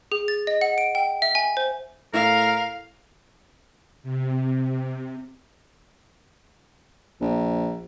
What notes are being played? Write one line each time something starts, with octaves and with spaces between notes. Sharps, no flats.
G#4
A6
D#5
F#5
D7
G5
E5
G#5
C5
A2 A#4 F5
C3
A#1